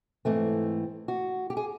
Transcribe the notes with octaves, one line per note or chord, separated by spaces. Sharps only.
G#2 E3 A3 C4
F#4
G4
G#4